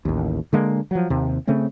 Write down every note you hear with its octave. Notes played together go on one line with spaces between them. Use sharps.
A1 D#2
D3 G#3 A#3
F3 F#3
D#2 C3
C#3 A3 C4 C#4